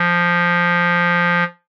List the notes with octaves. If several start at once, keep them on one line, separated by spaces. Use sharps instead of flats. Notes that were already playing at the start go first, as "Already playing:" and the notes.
Already playing: F3